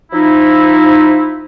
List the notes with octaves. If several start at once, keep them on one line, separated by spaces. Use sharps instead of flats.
F3 D#4 E4